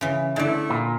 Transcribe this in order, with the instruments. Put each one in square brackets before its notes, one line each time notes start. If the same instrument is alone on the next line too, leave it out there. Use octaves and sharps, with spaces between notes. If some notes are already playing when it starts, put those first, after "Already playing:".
[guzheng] C#3 E3
[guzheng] D3 D5 [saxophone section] A3 E4
[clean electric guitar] A#2